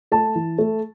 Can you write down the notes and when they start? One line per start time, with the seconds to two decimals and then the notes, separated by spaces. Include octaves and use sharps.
0.12 A3 A5
0.35 E3
0.58 A3